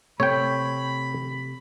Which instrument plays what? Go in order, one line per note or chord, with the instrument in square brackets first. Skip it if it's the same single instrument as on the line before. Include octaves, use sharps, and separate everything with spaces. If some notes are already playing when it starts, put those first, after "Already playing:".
[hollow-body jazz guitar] C3 A3 [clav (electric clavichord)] C#5 G5 [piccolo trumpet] B5